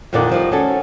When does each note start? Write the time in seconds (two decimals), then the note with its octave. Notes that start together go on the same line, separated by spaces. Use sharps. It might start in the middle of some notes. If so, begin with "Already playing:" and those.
0.13 F2 A#2 D3 D#3 D5
0.29 D#3 F3 G3
0.52 C#4 F#4 A4